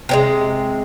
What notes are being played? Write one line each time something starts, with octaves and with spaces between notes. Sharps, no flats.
C3 F3 G#3